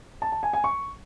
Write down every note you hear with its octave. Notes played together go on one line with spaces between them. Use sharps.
A5
A5
G#5
G#5
C#6